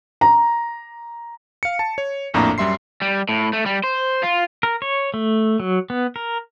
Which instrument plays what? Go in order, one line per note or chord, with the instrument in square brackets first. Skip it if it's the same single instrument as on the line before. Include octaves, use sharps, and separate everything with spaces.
[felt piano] A#5
[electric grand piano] F5 C#7
A5
C#5
A#1 F2 A2 A#3 D4 A#5
F#2 G3 E5 C6 C7
[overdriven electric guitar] G3
A2
A3
G3
C5
F4
[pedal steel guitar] A#4
C#5
A3
F#3
B3
A#4